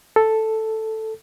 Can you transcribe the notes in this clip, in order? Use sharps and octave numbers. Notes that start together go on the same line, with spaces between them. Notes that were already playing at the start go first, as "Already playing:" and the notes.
A4